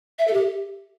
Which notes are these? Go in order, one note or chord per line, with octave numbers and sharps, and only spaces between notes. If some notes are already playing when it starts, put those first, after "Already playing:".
E5
A4
G4